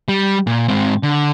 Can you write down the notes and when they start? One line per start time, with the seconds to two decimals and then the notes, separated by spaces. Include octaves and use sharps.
0.08 G3
0.47 A#2
0.68 G#2 C4
1.03 D3